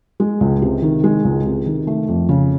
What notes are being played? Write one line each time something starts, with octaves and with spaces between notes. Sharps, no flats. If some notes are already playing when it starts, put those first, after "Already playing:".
G#3
C#2
C3
D#3
G#3
C#2
C3
D#3
A3
F2
C#3